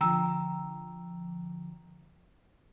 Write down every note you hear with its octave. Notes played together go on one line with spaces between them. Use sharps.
D3 F3 G5 A#5 E6